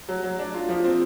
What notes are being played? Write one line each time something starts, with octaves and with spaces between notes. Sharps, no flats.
F#3
F#3
D4
F4
F3
C4